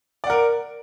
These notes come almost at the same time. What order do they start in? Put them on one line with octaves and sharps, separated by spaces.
D5 F#5 A#4